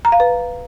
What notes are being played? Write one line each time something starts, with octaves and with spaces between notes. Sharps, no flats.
A#5
F5
B4